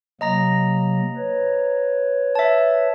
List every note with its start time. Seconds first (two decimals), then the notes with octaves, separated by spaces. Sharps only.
0.21 C3 F#3 A#3 D#5 A#5 A#6
1.17 B4 C#5
2.35 E5 A5